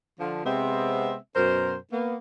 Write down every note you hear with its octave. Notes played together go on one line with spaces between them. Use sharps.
D3 F3
C3 G#3 B3 C4 E5
F#2 B2 A#4 C5
A#3 B3